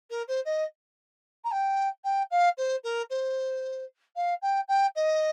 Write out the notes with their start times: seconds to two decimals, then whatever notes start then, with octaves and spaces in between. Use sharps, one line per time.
0.10 A#4
0.28 C5
0.45 D#5
1.44 A#5
1.51 G5
2.04 G5
2.31 F5
2.58 C5
2.84 A#4
3.10 C5
4.16 F5
4.42 G5
4.68 G5
4.95 D#5